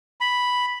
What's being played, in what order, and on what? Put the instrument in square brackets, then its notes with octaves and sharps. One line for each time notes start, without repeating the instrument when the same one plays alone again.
[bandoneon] B5